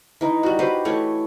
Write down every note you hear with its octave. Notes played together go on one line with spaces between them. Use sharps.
E3 D#4
G3 F#4
F#4 G4 B4 C5
E3 A3 C#5